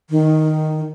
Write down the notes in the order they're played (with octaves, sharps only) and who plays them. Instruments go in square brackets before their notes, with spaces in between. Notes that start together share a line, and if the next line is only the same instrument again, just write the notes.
[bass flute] D#3